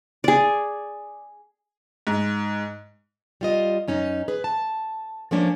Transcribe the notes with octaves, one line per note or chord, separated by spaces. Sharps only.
G#4 D5
G#2
G3 F4 D#5
F#2 C#4 D#4
G#4 B4
A5
F3 A3 A#3 C#4 D4